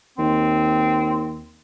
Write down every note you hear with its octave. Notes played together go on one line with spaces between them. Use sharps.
D#2 C4